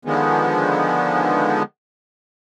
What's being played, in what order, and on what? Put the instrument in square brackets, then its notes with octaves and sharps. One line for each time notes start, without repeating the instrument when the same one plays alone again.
[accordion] D3 D#3 F3 G#3 B3